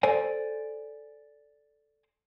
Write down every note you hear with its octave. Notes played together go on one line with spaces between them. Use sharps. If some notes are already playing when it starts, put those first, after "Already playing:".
A4 C5 D5 G#5